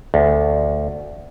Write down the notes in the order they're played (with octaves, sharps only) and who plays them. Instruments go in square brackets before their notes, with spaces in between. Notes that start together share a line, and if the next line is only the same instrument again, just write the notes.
[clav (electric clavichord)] D2